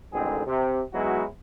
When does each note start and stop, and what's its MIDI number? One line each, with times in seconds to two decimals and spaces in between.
0.13 0.45 33
0.13 0.45 44
0.13 0.45 50
0.13 0.45 51
0.13 0.45 60
0.13 0.45 68
0.45 0.81 48
0.94 1.24 54
0.94 1.24 56
0.94 1.24 59
0.94 1.24 63
0.94 1.24 64
0.94 1.24 66